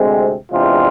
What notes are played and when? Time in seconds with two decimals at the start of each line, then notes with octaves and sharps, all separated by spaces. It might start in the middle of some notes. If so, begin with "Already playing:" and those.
Already playing: D2 C3 G#3 C4
0.52 E2 C3 G#3 D4 F4